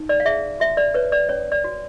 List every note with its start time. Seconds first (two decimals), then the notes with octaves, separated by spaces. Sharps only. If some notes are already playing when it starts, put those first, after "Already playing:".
Already playing: D#4
0.09 D5
0.20 F5
0.26 G#4 E5
0.60 F#4 E5
0.77 D5
0.94 B4 C#5
1.12 D5
1.29 C#4 C#5
1.52 D5
1.64 F#4